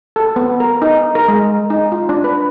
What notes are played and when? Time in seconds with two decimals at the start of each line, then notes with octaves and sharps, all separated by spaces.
0.16 A4
0.36 B3
0.60 A#4
0.82 D#4
1.15 A#4
1.28 G#3
1.70 D#4
1.92 F4
2.09 D4
2.24 B4